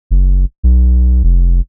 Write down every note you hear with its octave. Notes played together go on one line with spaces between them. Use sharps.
F#1
B1
F1